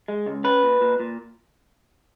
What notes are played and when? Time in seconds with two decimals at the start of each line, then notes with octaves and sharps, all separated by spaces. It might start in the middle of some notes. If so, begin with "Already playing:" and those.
0.08 G#3
0.26 C#2
0.44 C#4 B4
0.63 A#2
0.81 A#2
1.00 A#2